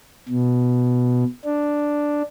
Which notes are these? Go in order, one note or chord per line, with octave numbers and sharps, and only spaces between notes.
B2
D4